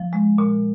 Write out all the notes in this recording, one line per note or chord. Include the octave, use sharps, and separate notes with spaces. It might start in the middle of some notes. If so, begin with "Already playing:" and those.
Already playing: F3
G#3
A#2